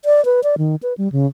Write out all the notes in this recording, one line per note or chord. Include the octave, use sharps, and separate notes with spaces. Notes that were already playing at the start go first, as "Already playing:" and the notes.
D5
B4
D5
D#3
B4
G3
C#3